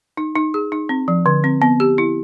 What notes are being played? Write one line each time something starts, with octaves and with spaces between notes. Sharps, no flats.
D#4
D#4
G#4
D#4
C4
F3
D3
C4
B3
G4
E4